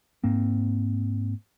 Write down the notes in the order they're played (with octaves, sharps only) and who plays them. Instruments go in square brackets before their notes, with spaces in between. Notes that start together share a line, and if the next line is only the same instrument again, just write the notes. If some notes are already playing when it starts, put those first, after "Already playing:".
[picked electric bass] G#2 A#3 C4